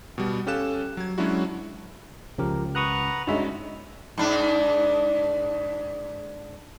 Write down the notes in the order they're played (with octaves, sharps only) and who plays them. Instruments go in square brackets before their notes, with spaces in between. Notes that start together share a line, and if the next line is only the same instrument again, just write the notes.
[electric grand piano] B2 G3 B3
C#4 G4 A4 F5 F#6 E7
F#3 G#6
F#3 G#3 C#4 D4 E4 F#4
[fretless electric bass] C#2 C#3 [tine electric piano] F3 G4 A#4
[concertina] B4 F#5 A#5 [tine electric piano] C#6 D#6 F#6
[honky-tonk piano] G2 G#3 C#4 [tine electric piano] D#4 F#4 E5
[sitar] G#2 D4